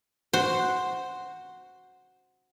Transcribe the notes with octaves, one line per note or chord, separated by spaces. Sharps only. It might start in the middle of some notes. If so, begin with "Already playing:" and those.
F#4 C5